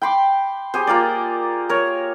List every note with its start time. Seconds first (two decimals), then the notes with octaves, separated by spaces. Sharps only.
0.02 G5 B5 C6 D6
0.74 G4 G#4 C5
0.87 A#3 F4 A#4 D5
1.69 A#4 C#5